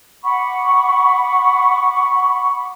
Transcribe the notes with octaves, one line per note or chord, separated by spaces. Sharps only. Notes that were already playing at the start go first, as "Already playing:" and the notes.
F#5 B5 C#6 D6